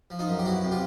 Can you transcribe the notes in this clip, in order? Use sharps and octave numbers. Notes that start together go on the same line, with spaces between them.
F3
D#4 F4
F#2
G4
E2 E4 F#4
C3
F4 G4